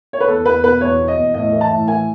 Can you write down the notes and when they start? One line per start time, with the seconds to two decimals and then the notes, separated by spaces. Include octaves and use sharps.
0.13 C#5
0.20 B4
0.28 E2 A4
0.46 E2 B4
0.64 B2 B4
0.81 E2 C#5
0.99 B2
1.08 D#5
1.17 E2
1.34 A2 D#5
1.52 E3
1.61 A5
1.70 A2
1.88 E3 G#5